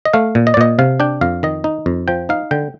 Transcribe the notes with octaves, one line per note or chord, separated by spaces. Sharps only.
D#5
A3 F5
A#2
D#5
D5
A#2 D#5
C3 F5
D4 G5
F2 F5
D#3 D#5
D#4
F2
F3 G5
D#4 F5
D3 G5